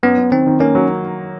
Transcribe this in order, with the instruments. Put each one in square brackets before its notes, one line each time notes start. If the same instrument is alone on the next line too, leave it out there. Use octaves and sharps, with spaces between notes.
[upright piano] F#2 [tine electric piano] B3
[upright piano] F#2
[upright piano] D#3 [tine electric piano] C4
[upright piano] D#3
[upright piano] A#3 [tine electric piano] C#4
[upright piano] F#3